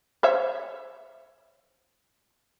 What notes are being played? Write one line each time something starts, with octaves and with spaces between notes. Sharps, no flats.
C5 C#5 E5